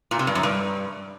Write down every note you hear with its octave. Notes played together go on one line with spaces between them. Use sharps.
A#2
C3
G2
F#2
G2